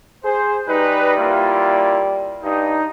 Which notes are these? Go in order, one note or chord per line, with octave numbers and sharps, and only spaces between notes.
G#4 C5
G3 D#4 B4
A#3 E4 F4
G2 D#4